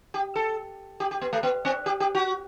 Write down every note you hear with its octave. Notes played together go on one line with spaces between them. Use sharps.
G4
A4
G4
G4
B3
A3
B3
C4
G4
G4
F#4